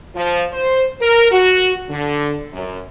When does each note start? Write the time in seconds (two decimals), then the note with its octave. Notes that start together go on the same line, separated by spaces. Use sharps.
0.15 F3
0.52 C5
1.01 A#4
1.32 F#4
1.90 D3
2.53 F#2